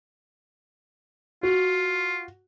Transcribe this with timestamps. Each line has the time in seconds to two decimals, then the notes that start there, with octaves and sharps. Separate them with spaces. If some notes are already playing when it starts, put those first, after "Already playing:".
1.43 F4 F#4